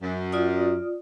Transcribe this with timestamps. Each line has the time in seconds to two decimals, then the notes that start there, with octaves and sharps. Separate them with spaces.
0.03 F#2
0.32 F4 D5 D#6